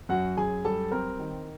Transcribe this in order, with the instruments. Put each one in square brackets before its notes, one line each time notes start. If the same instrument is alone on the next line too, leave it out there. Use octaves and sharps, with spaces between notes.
[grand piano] F#2 F#4 F#5
F#2 G#4 G#5
G3 A4 A5
C4 A#4 A#5
D#3